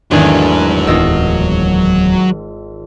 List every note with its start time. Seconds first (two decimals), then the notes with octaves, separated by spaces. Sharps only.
0.11 G#1 E2 D3 D#3 F#3 A3 G#5
0.87 D1 E2 D#3 F4 D#5 E6